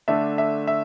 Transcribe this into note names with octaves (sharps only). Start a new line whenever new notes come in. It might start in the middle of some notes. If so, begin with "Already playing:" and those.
D3 A3 D4 E5
E5
E5